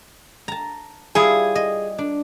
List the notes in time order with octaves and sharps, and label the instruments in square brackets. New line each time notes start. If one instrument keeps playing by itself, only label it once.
[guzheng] A5 A#5
[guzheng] G3 E4 F4 [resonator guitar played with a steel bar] G#4
[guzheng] D#5
D4